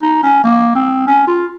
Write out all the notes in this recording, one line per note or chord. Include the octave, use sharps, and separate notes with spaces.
D#4
C#4
A#3
C4
C#4
F4